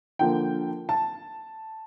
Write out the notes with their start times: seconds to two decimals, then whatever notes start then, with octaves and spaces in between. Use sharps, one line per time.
0.19 D3 F3 A#3 G5
0.89 A5